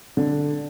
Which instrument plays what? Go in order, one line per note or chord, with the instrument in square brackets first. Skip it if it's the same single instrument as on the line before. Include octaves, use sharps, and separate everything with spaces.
[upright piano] D3